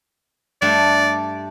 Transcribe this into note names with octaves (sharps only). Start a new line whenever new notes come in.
G2 A3 D5